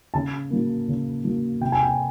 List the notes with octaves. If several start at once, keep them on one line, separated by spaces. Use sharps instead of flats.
C#3 A5
F#3 A#3
C#3
F#3 A#3
C3 G5
G#5
G5